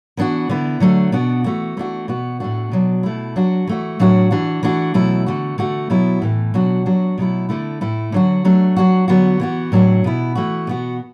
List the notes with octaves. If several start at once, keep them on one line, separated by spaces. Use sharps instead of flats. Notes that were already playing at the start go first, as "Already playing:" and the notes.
E3 B3 D4 F#4
D3 B3 E4
D3 F#3 A3 D4
B2 B3 D4 F#4
E3 A3 F#4
E3 A3 D4 F#4
B2 B3 F#4
A2 A3 D4 F#4
B2 F#3 D4
B2 A3 E4
F#3 D4 F#4
E3 A3 F#4
A2 F#3 D4 F#4
E3 D4 F#4
E3 A3 D4 F#4
B2 F#3 A3 E4
D3 A3 F#4
D3 A3 F#4
B2 F#3 B3 E4
A2 E3 A3
B2 F#3 D4 F#4
F#3 D4 F#4
B2 F#3 A3 E4
D3 A3 E4
A2 A3 E4
D3 F#3 D4 F#4
F#3 A3 D4
F#3 D4 F#4
D3 F#3 B3 F#4
E3 B3 F#4
A2 F#3 D4 F#4
B2 B3 E4
E3 A3 F#4
B2 B3 F#4